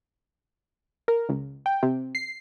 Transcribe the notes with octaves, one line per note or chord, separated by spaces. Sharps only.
A#4
C#2
G5
C3
C7